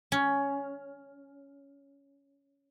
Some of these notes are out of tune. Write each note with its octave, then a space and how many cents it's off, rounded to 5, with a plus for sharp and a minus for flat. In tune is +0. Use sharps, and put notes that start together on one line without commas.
C#4 +10